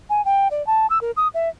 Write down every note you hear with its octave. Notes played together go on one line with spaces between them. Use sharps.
G#5
G5
D5
A5
E6
A#4
D#6
E5